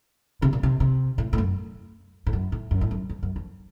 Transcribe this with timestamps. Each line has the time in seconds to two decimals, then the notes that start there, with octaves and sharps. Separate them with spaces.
0.42 C3
0.53 A#2
0.63 C3
0.80 C3
1.18 A2
1.33 A2
1.38 F#2
2.27 A2
2.33 F#2
2.52 A2
2.71 F#2
2.81 A2
2.91 F#2
3.09 F2
3.23 F#2
3.36 F2